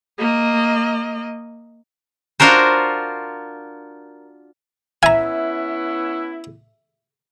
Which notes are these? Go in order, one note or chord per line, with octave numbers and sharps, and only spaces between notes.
A#3 D#5
D4 F4 F#4 A#4 C5
B3 C#4 E4 E5 G#5 A#5